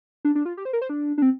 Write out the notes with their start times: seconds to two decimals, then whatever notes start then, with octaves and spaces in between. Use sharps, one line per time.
0.25 D4
0.35 D4
0.45 F4
0.57 G4
0.65 C5
0.73 A#4
0.81 C5
0.90 D4
1.18 D4
1.22 C4